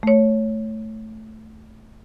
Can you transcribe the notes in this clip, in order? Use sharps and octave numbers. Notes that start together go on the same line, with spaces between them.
A3 C#5